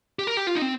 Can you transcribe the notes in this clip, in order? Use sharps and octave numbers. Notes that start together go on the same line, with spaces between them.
G4
A#4
G4
F4
D#4
C4